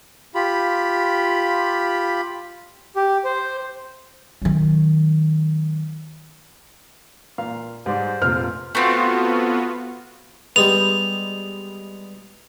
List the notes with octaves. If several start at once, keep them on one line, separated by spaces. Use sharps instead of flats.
F4 G4 B5
G4
C5
D#3 F#3
A#2 F5
G#2 G3 G#3 C5 D5
F1 A#1 C4 F6
A3 B3 C4 F4 F#4
G3 G#3 B3 F7